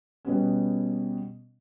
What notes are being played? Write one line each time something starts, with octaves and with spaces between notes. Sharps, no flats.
B2 G3 B3 C#4